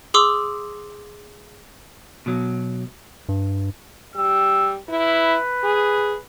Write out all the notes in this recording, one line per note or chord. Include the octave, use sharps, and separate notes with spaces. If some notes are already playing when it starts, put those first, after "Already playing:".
G#4 C6 D6 E6
B2 F#3
G2
G3 E6
E4 B4
G#4